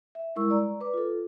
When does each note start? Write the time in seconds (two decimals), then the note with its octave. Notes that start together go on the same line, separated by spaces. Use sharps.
0.15 E5
0.36 G3 G#3 E4 A#4 C#6 E6
0.50 D5 A#5
0.81 B4 D6
0.94 F4 A4